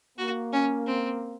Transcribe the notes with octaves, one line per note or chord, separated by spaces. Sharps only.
A#3 F#4
C#4
C4